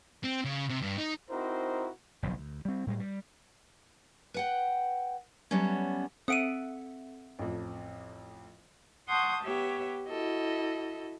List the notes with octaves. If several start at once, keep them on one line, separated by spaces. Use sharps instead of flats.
C4
C#3
C3
G2
D#4
C4 D#4 E4 F#4 A#4 C5
F#1 B1 G2 F3
D2
G3 C4
A2 G3 G#3
G3
B4 F#5 G5
F#3 G3 A3 B3 C#4
C4 A4 E5 F#5 D#6 D7 D#7
A1 F2
F#5 A5 C6 C#6 D#6 G6
B3 G4 C#5 E5
E4 F#4 A4 D#5